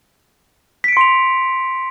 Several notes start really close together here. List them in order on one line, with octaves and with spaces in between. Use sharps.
B6 D7 C#7 C6 F7